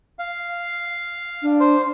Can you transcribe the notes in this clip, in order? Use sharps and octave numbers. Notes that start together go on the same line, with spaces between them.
F5
D4
C5